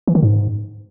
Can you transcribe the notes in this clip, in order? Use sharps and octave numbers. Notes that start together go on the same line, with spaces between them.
E3
D#3
G#2